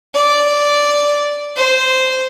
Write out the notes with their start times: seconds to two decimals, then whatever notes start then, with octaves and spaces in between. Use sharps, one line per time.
0.14 D5
1.56 C5